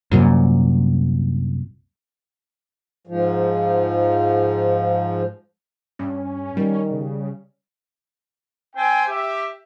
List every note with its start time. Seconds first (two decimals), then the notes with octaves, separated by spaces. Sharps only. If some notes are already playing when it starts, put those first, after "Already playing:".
0.12 C2 F#2 A#2
3.07 G#2 F3
5.99 G2 C#4
6.57 D#3 G3
6.91 C#3
8.76 C4 C5 G5 G#5
9.08 G4 E5